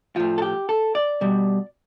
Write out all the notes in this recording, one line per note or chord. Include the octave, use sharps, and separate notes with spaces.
A2 F3 F4
A4
G4
A4
D5
B2 G3